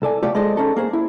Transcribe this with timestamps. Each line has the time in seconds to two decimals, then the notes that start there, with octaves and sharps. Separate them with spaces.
0.02 C2 A4 D5 G#5
0.23 A3 F4 G4 C#5 D5
0.35 G#3 A4 C5 D5 D#5
0.57 C#4 D#4 A4
0.76 A#3 G#4 C5
0.93 E4